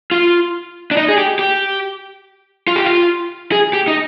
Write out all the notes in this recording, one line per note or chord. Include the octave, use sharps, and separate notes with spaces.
F4
D4
D#4
G#4
G4
G4
F4
G4
F4
G#4
G4
D#4